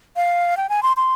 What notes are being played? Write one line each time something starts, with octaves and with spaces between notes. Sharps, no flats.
F5
G5
G#5
C6
C6